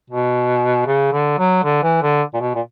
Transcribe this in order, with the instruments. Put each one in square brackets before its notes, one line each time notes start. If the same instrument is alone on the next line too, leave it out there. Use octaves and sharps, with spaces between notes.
[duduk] B2
C#3
D3
F#3
D3
E3
D3
A#2
B2
A#2